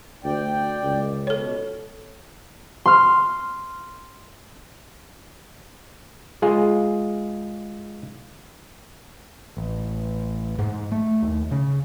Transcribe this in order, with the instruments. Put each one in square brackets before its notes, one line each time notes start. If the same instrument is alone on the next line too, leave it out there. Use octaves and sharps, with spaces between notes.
[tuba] D2 [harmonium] D5 G5
[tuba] C#2
[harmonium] B2 [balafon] A4 C#5
[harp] C6 F6
[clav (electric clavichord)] G#3 F4 G#4
[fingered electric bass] A1
G#2
A3
D#2
C#3